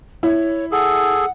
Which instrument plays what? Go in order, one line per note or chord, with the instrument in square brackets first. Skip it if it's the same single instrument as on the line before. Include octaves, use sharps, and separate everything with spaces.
[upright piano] E4 [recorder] C#5
[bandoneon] G#4 A4 [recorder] F#5